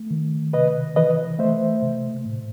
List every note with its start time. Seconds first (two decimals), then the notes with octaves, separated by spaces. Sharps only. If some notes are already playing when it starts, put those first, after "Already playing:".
Already playing: A3
0.11 D#3
0.53 C3 B4 D#5
0.96 E3 B4 D#5
1.39 A3 C5 E5
1.82 C3
2.26 A2